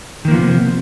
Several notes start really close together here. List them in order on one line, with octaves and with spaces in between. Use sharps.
D#3 A#3 F3 B3 C3